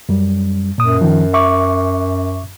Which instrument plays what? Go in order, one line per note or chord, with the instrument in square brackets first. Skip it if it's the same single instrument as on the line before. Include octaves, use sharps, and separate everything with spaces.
[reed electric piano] F#2 G3
[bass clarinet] F#2 [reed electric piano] A#2 D#6
[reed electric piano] D#3 F3
E5 C#6 D6